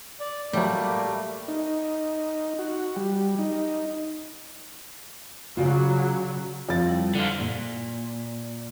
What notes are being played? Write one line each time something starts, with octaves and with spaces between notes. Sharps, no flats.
D5
A2 F#3 G3 A3 A#3
D#4
F#4
G3
D#4
C#3 F#3 F4 F#4 D5
F2 F3 A6
G3 E4
D3 F4
A#2